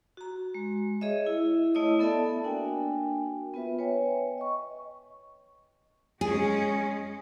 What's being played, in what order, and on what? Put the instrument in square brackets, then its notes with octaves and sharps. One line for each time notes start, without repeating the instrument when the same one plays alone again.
[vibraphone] F#4 A#5
G#3
G#4 C#5 D#5 E5
E4
A3 E4 C#5 D#5 D#6
B3 A4 D5 E5 A5
A#3 D4 F#4 A#4 G5 G#5
B3 F4 B4 E5
B4 C#5 G5 G#5
D#5 C#6
[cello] G#3 C#4 [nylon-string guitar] G#4